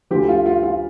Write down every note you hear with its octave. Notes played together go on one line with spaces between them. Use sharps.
D2 D3 F3 G4
F4
F4
F4